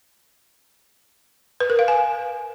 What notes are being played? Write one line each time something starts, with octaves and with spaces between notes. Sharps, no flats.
B4
A#4
F5
G#5